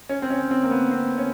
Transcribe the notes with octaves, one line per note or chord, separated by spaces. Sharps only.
C#4
C4
C#4
C4
A#3
B3
C4
C#4